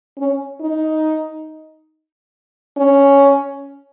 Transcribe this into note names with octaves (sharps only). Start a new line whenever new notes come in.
C#4
D#4
C#4